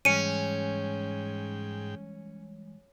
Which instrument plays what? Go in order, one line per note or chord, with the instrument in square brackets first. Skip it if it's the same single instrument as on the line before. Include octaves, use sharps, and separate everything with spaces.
[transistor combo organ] G#2 G5 [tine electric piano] E3 G3 G#3 [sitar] C#4 [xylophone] C#7 D#7